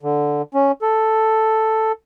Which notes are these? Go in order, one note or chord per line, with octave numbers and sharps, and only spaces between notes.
D3
C#4
A4